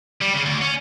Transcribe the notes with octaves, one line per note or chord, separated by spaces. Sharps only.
G3
C#3
D2
C#4